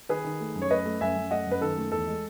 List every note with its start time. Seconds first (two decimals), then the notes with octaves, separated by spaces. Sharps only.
0.09 D#3 G#4 B4
0.25 D#3
0.40 A3
0.55 F#2
0.62 C#5
0.70 A3 B4 D#5
0.85 A3
1.01 F#2 E5 G#5
1.16 F#2
1.31 A3 D#5 F#5
1.47 F#2 B4
1.61 D#3 A4
1.77 A3
1.92 E2 A4
2.07 G#3